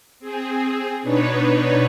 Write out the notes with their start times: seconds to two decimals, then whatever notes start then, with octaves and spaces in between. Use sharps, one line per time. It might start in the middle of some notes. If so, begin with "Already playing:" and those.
0.19 C4 G#4
1.03 B2 D4 D#4 B4 C#5